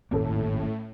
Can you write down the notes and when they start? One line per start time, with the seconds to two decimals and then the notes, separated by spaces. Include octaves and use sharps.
0.11 D#1 G#1 A2 A#3 C#4 A4